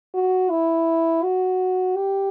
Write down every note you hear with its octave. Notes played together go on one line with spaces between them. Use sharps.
F#4
E4
F#4
G4